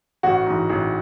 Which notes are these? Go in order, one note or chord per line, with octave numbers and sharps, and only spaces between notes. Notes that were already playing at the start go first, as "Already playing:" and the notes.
A1 F#4
G#2 E3
A1